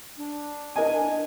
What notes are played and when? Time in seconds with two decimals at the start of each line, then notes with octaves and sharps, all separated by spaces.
0.17 D4
0.76 A#4 D#5 G#5